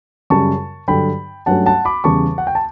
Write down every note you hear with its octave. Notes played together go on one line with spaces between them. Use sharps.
F#2 C#3 G3 A5 C#6
G2 D3 F#3 G5 B5
G2 F#3 A3 C#4 F#5 A5
F#5 A5
B5 D6
E2 C#3 G3 A5 C#6
F#5
G5
A5